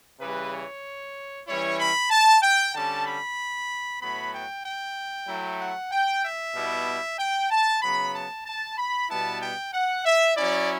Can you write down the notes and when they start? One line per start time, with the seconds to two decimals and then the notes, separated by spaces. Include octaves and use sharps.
0.20 C#3 E3 G3 B4
0.52 C#5
1.47 E3 G3 C#4 E4 C#5
1.79 B5
2.11 A5
2.43 G5
2.74 D3 G3 C#4 A5
3.06 B5
4.01 A2 F#3 B3 B5
4.33 G5
4.65 G5
5.28 F#3 A3 E4
5.60 F#5
5.92 G5
6.24 E5
6.55 B2 G3 B3 E4
7.19 G5
7.51 A5
7.82 C#3 F#3 B3 B5
8.14 A5
8.46 A5
8.78 B5
9.09 B2 G3 B3 E4 A5
9.41 G5
9.73 F#5
10.05 E5
10.36 F#3 C#4 E4 D5